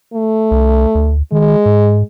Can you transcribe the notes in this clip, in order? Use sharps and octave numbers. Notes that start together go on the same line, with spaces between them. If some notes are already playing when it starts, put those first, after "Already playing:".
A3
C2
D2
D#3 G#3
G#2